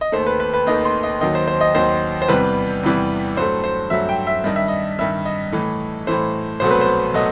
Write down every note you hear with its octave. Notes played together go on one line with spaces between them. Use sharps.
D#5
D#2 D#3 A3 C5
B4
B4
B4
D#2 D#3 A3 D#5
C6
D#5
D#2 D#3 F#3 D#5
C5
C5
D#5
D#2 D#3 F#3 C5
C5
E2 C3 E3 G3 B4
E2 C3 E3 G3
G2 F#3 A3 C5
C5
G2 F#3 A3 E5
G5
E5
G2 D#3 G3 D#5
E5
D#5
G2 D#3 G3 E5
D#5
A2 E3 A3
A2 E3 A3 C5
C2 B2 F#3 A3 C5
B4
C5
B2 F#3 A3 D#5